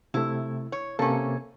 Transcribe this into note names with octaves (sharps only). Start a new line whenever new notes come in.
C3 A3 E4
C#5
C3 A#3 C#4 A4